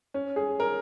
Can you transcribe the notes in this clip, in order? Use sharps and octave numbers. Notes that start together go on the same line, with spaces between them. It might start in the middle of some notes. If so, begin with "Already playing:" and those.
C#4
G#4
A#4